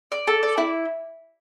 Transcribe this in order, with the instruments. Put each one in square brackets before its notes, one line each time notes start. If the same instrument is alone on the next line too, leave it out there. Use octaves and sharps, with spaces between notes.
[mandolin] D5
A4
D5
E4